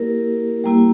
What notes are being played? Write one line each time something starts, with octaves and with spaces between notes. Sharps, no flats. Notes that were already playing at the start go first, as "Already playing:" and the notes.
Already playing: A#3 E4 G4 A#4
G3 A#3 E4 G4